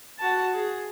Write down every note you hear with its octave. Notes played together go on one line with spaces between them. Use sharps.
F#4 A5
G#4